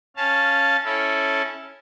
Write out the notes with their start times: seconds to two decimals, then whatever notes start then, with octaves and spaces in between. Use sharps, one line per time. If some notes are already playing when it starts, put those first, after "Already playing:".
0.16 C#4 F5 A5
0.84 C#4 E4 A4